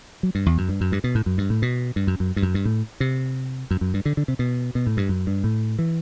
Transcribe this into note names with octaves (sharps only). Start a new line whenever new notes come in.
F#3
G2
E2
F#2
G2
F#2
G2
B2
A2
F#2
G2
A2
B2
G2
F#2
F#2
G2
F#2
G2
A2
C3
F#2
F#2
G2
D3
D3
C3
B2
B2
A2
G2
F#2
G2
A2
E3